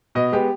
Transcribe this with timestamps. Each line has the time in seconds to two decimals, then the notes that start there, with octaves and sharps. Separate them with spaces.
0.15 B2 D#5
0.32 G#3 B3 G4